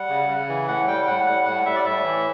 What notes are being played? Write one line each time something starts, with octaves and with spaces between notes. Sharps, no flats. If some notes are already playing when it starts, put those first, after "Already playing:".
Already playing: G3 F#5
C#3
C#3
E3
A2 F#5
G3 G5
A2 F#5
G3 F#5
A2 F#5
G3 E5
D5
A2 E5
E3